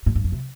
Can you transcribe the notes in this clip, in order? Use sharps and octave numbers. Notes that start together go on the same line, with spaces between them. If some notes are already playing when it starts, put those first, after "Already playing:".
A2
G2
F2
C3